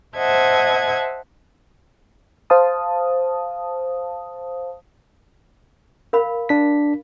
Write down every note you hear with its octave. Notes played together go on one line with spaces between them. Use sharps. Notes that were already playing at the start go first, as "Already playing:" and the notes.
C5 D#5 E5 F#5 A5 G#6
C5 F5 A5 D#6
A#4 F5 B5
D4 B6